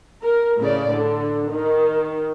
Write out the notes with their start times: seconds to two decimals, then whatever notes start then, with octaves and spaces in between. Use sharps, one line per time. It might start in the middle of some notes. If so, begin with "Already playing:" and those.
0.22 A#4
0.59 A2 C#3 D5
0.93 D3
1.52 D#3